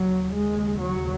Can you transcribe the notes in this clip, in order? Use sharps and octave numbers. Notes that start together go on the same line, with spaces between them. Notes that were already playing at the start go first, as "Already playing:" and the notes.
Already playing: D#2 C#3 F#3
G#3
F#3